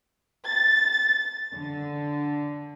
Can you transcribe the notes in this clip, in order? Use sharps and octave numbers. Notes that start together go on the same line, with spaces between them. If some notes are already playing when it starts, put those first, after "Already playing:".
A6
D3